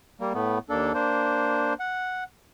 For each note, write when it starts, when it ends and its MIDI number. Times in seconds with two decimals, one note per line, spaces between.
0.20 0.33 55
0.20 0.33 58
0.34 0.58 45
0.34 0.58 57
0.34 0.58 59
0.70 0.92 39
0.70 0.92 58
0.70 0.92 62
0.70 0.92 69
0.94 1.74 58
0.94 1.74 62
0.94 1.74 72
1.80 2.24 78